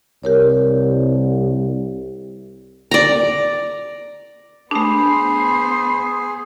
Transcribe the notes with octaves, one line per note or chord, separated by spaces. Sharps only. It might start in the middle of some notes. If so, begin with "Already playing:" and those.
C2 G4 A#4 C#5
D5 A#5
A3 B3 D4 G#4 C5 B5